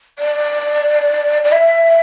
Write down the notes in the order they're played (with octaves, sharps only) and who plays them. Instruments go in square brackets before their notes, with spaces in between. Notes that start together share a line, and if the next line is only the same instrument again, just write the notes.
[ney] D5
D5
E5